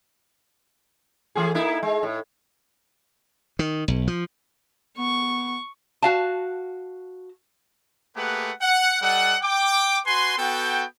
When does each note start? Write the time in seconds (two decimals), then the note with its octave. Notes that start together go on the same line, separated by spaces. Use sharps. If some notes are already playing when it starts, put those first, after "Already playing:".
1.35 E3 A3 G#4
1.55 A#3 D#4 E4
1.83 G#3
2.03 A2
3.59 D#3
3.88 B1
4.07 F3
4.99 B3 C#6
6.03 F#4 F5 A5
8.16 A3 A#3 G4 G#4 B4 F#5
8.62 F#5
9.02 G3 A4 D#5 F#5
9.42 G5 D6
10.06 F#4 B4 G#5 C6
10.38 B3 F#4 A4 G5